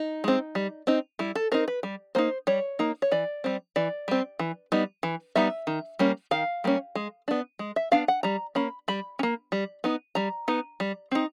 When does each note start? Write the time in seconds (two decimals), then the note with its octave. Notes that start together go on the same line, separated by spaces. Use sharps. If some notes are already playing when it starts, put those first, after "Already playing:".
Already playing: D#4
0.24 G#3 C4
0.55 G3
0.87 C4 D#4
1.19 G3 E4
1.35 A4
1.52 C4 D#4 A#4
1.68 B4
1.83 G3
2.15 A#3 D#4 C5
2.47 G3 C#5
2.79 A#3 D#4
3.02 C#5
3.12 E3 D5
3.44 G3 C4
3.76 E3 D5
4.08 G3 C4
4.39 E3
4.72 G3 B3 D#4
5.03 E3
5.35 G3 B3 D#4 E5
5.67 D#3
5.99 G3 A#3 C#4
6.31 D#3 F5
6.64 G3 A#3 C#4
6.95 G#3
7.28 B3 D4
7.59 G#3
7.76 E5
7.92 B3 D4 F5
8.08 F#5
8.23 G3 A#5
8.55 A#3 C#4 B5
8.88 G3 B5
9.19 C#4
9.23 A#3
9.52 G3
9.84 B3 D#4
10.15 G3 A#5
10.48 B3 D#4
10.80 G3
11.11 C4 D#4